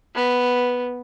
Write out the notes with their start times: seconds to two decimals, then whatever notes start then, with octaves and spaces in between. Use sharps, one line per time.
0.15 B3